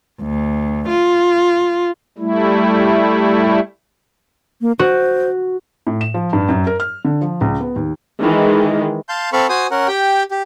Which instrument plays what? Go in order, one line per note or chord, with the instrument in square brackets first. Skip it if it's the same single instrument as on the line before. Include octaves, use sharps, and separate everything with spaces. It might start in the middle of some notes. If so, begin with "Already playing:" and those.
[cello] D2
F4
[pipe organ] G3 A3 E4
[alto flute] A#3
[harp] F#4 [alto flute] C5
[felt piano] A2
E7
F3
G2
F#2
A#4
F6
D3
F3
C#2
B3
D#2
[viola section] D#3 E3 G#3
[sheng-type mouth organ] F5 A5 C6 G6
C4 A4 F5 B5 C#6
F#4 C5 G#5 D#6
C#4 A#4 F#5
G4 G5
G4